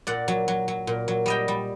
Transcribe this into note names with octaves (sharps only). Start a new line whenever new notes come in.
A#2 D5 F#5
F#3
F#3
F#3
A#2
F#3
G3 D#5 G5
G3